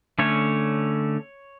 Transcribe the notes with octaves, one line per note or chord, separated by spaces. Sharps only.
D3 A3 C#4 C#5